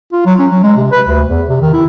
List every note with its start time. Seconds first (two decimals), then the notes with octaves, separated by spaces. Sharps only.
0.13 F4
0.26 F#3
0.39 C#4
0.51 F#3
0.64 G#3
0.77 C3
0.92 B4
1.07 D2
1.29 E2
1.49 C3
1.61 D#3
1.73 E4